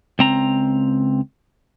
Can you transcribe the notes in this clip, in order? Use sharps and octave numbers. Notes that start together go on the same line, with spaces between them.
C#2 C4 A#5